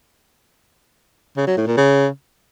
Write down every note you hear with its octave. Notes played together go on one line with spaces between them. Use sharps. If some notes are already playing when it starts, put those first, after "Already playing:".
C#3
F#3
A2
A#2
C#3